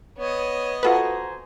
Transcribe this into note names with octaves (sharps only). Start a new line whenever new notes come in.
B3 C#5 D#5
F4 F#4 A4 B4 C5 G#5 A#5 D#6